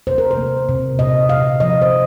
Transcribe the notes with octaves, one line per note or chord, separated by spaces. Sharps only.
C3 C5
A#4
C5
A#3
C3
A#2 D#5
A#2 F5
F3 D#5
C5